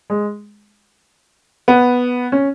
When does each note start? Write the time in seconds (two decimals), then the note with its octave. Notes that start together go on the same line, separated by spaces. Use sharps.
0.10 G#3
1.68 B3
2.32 C#4